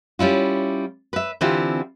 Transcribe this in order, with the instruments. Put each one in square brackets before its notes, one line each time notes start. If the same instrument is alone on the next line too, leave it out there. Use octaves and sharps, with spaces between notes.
[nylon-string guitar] G3 C#4 E4 F4
B4 E5
D3 E3 C4 E4 F4 G4